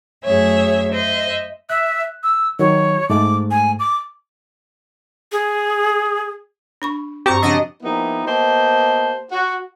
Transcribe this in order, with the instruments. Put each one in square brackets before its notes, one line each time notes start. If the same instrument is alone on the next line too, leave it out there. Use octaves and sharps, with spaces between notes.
[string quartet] F#2 A3 G#4 C#5 E5
C5 D#5 E5
[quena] E5 [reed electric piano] F#6
[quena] E6
[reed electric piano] D#3 F#3 [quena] C#5
[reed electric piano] G#2 G#3 A3 [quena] D6
[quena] G#5
D6
G#4
[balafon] D4 B5 C#6
[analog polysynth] G2 A#5 C#6 [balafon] C4 F#4 C5 [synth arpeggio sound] G4
[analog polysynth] C#3 D4 D#5 [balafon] F3 C4 F#5
[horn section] F3 A#3 B3 D#4 E4 G4
A#3 B3 G4 C5 D#5 A5
F#4